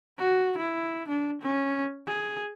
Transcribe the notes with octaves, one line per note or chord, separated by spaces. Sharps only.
F#4
E4
D4
C#4
G#4